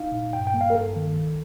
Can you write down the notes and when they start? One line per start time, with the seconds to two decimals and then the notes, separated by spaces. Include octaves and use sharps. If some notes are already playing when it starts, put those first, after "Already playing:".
Already playing: D#4 F5
0.12 A#2
0.33 G2 G5
0.47 G5
0.54 A#3
0.61 F5
0.70 A#4
0.75 G2 A4
0.96 D#3
1.16 C2